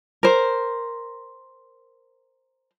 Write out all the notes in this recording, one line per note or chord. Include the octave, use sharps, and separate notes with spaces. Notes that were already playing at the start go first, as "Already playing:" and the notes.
A#4 C5